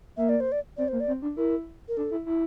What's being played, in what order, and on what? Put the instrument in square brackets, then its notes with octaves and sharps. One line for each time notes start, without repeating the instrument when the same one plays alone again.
[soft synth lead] A#3 [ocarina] E5
[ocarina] D5
C5
D5
[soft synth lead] C4 [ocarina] D5
[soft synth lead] A#3 [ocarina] C5
[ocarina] D5
[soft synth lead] C4
D4
[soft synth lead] E4 [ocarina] A#4
[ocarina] A#4
[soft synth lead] D4 [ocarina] A4
[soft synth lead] E4
E4